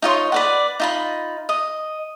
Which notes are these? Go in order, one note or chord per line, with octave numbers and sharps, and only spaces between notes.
D#4 F4 C#5 C6
B4 D5 F#5
D#4 F4 B5
D#5